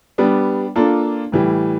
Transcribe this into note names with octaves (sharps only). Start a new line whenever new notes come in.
G3 B3 D4
A#3 D4 F4 A4
A2 E3 G3